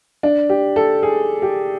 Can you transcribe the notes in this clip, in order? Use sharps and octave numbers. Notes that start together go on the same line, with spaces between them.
D4
G4
A4
G#4
G4